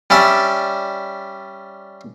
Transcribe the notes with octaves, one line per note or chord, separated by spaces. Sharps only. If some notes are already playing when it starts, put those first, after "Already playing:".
G3 C#4 D5 E5